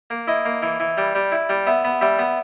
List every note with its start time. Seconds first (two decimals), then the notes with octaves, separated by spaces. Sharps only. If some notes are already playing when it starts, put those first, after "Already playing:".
0.10 A#3
0.27 E4 D#5
0.45 A#3
0.63 E3
0.80 E3
0.98 G3
1.15 G3
1.32 E4
1.49 G3
1.67 B3 E5
1.84 B3
2.01 G3 E5
2.19 B3